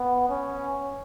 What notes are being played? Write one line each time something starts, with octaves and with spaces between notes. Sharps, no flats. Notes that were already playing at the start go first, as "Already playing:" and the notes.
Already playing: B3
C#4